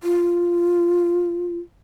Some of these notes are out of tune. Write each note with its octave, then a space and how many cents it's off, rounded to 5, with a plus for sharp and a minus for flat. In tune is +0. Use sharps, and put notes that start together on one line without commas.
F4 -5